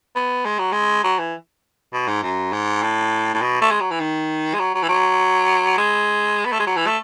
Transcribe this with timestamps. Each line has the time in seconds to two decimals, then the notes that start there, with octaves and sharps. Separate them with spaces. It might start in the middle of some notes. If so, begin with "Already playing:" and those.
0.16 B3
0.46 G#3
0.59 F#3
0.72 G#3
1.04 F#3
1.19 E3
1.93 B2
2.08 G#2
2.23 F#2
2.53 G#2
2.83 A2
3.34 A2
3.42 B2
3.61 A3
3.71 G#3
3.81 F#3
3.91 E3
4.00 D#3
4.54 G#3
4.59 F#3
4.75 F#3
4.83 E3
4.89 F#3
5.78 G#3
6.45 B3
6.52 A3
6.59 G#3
6.67 F#3
6.77 E3
6.87 A3